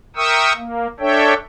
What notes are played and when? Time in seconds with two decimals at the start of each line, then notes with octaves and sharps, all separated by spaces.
0.16 A#4 E5 G5 C#6 D#6 E6
0.57 A#3
1.00 D4 A4 C#5 E5 G5